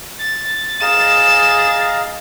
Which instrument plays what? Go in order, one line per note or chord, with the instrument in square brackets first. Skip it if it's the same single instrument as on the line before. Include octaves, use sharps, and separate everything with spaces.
[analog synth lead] A6
[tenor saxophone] G#4 [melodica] D#5 F5 A#5 [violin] E7